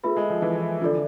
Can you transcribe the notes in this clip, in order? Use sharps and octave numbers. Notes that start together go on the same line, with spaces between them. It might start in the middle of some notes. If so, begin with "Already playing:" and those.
A3 F4 G#4 B4 E5 B5
G#3
F3
E3
D3 F4 A4 D5